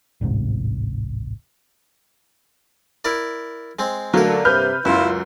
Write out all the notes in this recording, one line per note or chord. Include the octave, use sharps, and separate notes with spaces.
D1 A1 G#2 C3
E4 A#4 D5
G#3 C4
D3 F#3 A3 A#3 A#4
G2 C3 B4 F6 G6
C#2 F#2 E4 F4